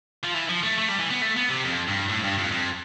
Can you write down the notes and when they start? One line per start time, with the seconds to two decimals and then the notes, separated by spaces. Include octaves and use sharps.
0.24 F3
0.34 E3
0.49 F3
0.63 A3
0.78 A3
0.89 G3
0.99 E3
1.11 B3
1.22 A3
1.36 B3
1.50 C3
1.65 F2
1.87 G2
2.09 A2
2.23 G2
2.38 F2
2.52 F2